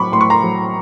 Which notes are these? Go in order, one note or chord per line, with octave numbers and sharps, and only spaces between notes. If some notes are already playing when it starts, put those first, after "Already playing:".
Already playing: A2 F#3 B5 C#6 D6
A2 C6
C#6
A#5 C6
F#3